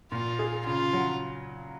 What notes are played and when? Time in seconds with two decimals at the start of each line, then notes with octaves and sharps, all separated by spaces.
0.12 A#2 F4
0.39 G#4
0.66 C#3 F4
0.93 F#3